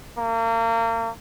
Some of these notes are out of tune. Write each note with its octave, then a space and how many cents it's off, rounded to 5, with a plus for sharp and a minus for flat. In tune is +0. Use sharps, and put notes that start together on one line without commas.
A#3 -35